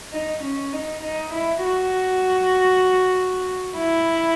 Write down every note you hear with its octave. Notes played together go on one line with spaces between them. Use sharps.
D#4
C#4
D#4
D#4
E4
F#4
E4